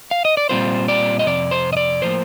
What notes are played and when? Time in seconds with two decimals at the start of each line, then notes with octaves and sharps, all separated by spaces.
0.11 F5
0.25 D#5
0.37 D5
0.49 A#2 G3 C4 F4 C5
0.88 D5
1.19 D#5
1.26 F2 C3 D5
1.51 C5
1.73 D#5
1.77 D5
2.02 A2 F3 A#3 C5